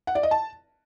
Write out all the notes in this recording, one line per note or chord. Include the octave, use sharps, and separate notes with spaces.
F#5
D5
D#5
A5